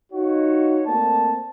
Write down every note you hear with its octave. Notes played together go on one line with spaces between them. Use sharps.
D#4 F4 F#4 C#5
A3 A#3 C4 C5 D5 A5